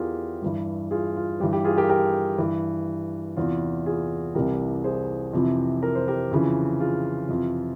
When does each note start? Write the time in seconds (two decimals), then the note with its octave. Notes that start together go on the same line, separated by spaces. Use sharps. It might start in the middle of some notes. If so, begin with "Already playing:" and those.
Already playing: E2 E3 F4 G4 G#4 A#4
0.42 G2 E3
0.91 F4 G#4
1.16 F4
1.40 G2 G4
1.43 E3
1.53 G4
1.64 F4 G#4
1.77 G4 A#4
1.90 G4 A#4
2.38 G2 E3
3.36 E2 C3 E3 F4
3.86 F4 G#4
4.35 C2 C3 E3 G4 A#4
4.84 G#4 C5
5.33 F2 C3 E3
5.83 A#4
5.95 C5
6.08 G4 A#4
6.31 F2 C#3 E3
6.80 F4 G#4
7.29 F2 C3 E3